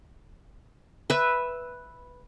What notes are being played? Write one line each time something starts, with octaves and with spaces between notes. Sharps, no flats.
B4 E5